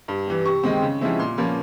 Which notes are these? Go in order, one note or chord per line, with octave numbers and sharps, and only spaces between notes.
G2
E3 G3
C3 C#6
D#3 G#3 C4
C#3
F3 G#3 C4 E4
A#2 C6
F3 A#3 C#4 B5